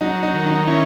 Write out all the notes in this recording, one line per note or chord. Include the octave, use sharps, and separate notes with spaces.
F#3 D#4
D#4
D#3
D#4
C#4 E4